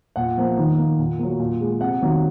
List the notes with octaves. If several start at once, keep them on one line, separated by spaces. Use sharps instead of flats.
A#2 F#5
F3 A#3
D#3
A#3
A#2
F#3 A#3
A#2
G#3
C3 F#5
D#3 F#3 A#3